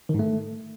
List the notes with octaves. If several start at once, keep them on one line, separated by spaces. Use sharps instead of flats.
D#3
G#2
A3